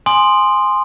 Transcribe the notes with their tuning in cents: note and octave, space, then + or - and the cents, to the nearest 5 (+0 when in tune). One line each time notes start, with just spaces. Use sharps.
G#5 +0 C6 +0 D#6 -25